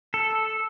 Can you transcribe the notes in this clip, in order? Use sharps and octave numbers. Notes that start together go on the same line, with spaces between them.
A4